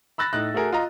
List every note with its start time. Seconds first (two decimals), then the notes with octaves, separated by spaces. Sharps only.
0.18 B5 E6 F#6 A6 A#6
0.33 A2 D#4 F#6
0.54 A3 F#4 G#4 A#4
0.72 F4 D#5 A#5